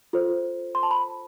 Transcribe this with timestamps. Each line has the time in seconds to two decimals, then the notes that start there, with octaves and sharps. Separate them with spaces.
0.13 F4 A4 C5
0.75 C6
0.83 A5
0.91 B5